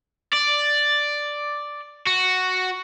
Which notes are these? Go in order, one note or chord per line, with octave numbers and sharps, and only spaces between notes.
D5
F#4